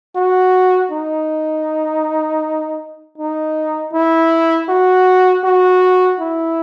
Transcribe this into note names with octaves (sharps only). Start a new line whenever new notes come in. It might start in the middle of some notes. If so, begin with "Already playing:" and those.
F#4
D#4
D#4
E4
F#4
F#4
E4